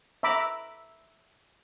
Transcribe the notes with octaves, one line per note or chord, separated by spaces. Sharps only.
E5 A#5 B5 D6